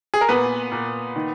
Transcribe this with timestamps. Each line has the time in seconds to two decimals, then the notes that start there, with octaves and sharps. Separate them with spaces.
0.14 G#4
0.21 A#4
0.28 A#2 B3 B4
0.72 A#2
1.16 D#3